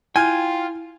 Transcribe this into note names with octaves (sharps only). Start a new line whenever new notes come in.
E4 F4 G5 G#5 F6 G6